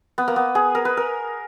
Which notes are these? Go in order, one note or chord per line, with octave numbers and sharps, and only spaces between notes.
B3
A#3
B3
G#4
A#4
B4
A#4